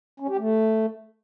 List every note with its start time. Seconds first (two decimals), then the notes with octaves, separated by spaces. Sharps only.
0.20 C#4
0.29 G4
0.37 A3